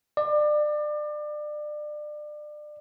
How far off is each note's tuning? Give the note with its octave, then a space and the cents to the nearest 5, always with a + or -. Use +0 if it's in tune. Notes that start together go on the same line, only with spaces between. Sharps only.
D5 +30